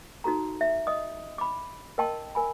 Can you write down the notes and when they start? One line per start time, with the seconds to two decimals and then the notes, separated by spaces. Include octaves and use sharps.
0.24 D#4 F#4 A4 A#5
0.61 E5
0.87 D#5 D#6
1.38 B5 D6
1.98 A#4 D#5 G5 A5 C6
2.35 A#4 G#5 B5